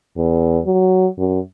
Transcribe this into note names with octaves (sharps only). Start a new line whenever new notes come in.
E2
F#3
F#2